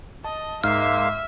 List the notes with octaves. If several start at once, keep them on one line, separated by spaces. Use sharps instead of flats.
D#5 A5
G#2 G#3 A#3 E5 F5 F6